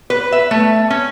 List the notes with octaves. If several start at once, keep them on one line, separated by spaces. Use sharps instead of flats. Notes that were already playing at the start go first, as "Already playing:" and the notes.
B4
E5
A3
C#4